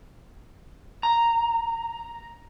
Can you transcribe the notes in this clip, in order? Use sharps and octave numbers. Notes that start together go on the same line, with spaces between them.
A#5